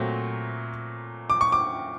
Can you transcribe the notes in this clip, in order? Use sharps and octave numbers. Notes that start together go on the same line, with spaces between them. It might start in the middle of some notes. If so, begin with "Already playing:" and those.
Already playing: A#2 F#3 A3 C4
D6
C#6
D6